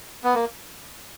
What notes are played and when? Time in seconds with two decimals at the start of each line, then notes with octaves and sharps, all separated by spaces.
0.24 B3
0.34 A#3